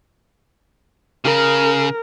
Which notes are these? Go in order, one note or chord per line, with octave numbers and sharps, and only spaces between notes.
C#3 A#4